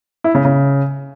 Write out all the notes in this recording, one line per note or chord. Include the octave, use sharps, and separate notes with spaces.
E4
C#3
C#3